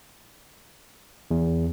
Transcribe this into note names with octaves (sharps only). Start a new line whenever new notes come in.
E2